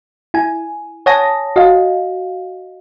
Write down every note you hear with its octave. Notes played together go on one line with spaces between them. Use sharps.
E4 G#5
C#5 F#5 G#5 A5 D#6 A#6
F#4 D#5 F5